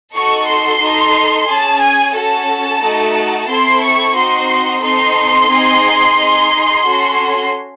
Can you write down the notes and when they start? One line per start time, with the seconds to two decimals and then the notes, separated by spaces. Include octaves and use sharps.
0.14 D#4 F#4 A4 C#6
0.47 C6
0.81 D#4 A4
1.48 C#4 G#4 A5
1.81 G#5
2.14 C#4 F#4 A4 A5
2.82 A3 D#4 F#4 A4
3.49 C4 E4 A4 C6
3.82 C#6
4.16 C4 D#4 F#4 C6
4.83 C4 D#4 A4 C6
5.50 C4 D#4 G#4
6.18 D#4 G#4
6.84 C#4 F#4 A4